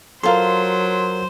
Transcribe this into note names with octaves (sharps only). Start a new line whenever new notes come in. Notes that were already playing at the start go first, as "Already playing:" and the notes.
F#3 F4 A4 A#4 C5 C6